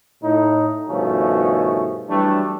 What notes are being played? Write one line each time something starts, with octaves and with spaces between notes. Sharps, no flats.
A2 D#4
G2 B2 D#3 F3 A3 C#4
E3 F#3 G3 A3 D4